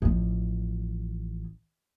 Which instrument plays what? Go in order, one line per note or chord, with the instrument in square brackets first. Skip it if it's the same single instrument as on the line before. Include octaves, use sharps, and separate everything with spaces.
[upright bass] A1 F3